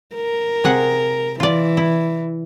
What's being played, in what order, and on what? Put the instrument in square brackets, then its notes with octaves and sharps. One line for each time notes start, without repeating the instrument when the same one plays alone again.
[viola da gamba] A#4
[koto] C3 G#4 F#5
[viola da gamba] E3 [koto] F4 D5
[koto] E4